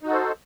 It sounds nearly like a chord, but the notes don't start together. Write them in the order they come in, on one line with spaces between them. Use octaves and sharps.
D#4 F#4 A4 C5